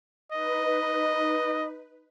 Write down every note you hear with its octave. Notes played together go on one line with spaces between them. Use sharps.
D#4 B4 D#5